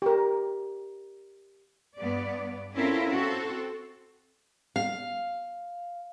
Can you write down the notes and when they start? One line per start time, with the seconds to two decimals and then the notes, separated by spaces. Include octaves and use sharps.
0.02 G4 A#4
1.97 G2 B3 D5
2.74 C4 C#4 E4 F4 A4 A#4
3.10 C4 F#4 A4
4.76 F5